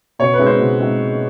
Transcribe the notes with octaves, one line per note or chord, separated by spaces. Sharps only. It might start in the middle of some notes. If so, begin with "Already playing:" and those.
B2 C#5
B4
G#3 C4 D#4
C5
B2
G#3 C4 D#4